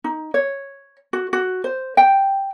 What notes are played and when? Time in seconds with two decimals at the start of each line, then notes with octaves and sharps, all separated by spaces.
0.04 D#4
0.34 C#5
1.13 F#4
1.33 F#4
1.64 C5
1.97 G5